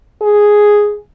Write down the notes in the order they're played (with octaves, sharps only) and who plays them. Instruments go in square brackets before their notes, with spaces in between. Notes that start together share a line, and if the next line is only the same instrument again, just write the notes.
[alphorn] G#4